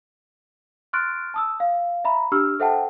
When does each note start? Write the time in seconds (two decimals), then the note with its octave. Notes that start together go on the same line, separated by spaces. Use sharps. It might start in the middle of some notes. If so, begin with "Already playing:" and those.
0.93 C6 C#6 F6 F#6 A6 D7
1.34 A5 D#6 E6
1.60 F5
2.05 E5 A#5 B5
2.32 D4 G4 C#6 E6 F6
2.60 A4 C5 E5 F#5 G5 A5